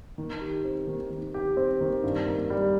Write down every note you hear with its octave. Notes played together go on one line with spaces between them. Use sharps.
D#3
G4
C4
D#3
D#3
G4
C4
D#3
G2
A#3
G3